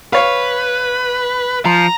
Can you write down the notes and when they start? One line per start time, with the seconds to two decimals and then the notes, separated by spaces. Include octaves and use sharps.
0.13 B4 C#5 F5
1.65 F3 A#5